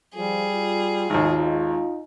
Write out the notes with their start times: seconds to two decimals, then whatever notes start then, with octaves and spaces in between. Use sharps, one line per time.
0.15 F3 G3 G#4
0.54 F4
1.10 G#1 D#2 G#3 D#4 F4